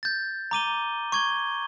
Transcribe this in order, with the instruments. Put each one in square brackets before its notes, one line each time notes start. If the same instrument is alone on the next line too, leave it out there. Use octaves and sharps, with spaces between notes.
[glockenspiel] G6 A6
A#5 D6 D#7 G7
C#6 G#6 G7